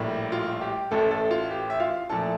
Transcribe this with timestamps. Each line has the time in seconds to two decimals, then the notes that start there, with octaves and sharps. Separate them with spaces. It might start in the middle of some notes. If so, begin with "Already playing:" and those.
Already playing: A#1 A2 G3 A#3
0.32 F4
0.61 G4
0.91 A1 A2 E3 A3 A4
1.11 A3 A4
1.31 F4
1.51 G4
1.70 E5
1.80 F4 F5
2.09 A#2 F3 A3 E4 A4 A5